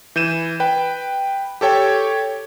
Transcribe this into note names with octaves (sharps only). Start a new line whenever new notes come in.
E3 G6 D#7 E7
B4 G5
G4 A4 C#5 G5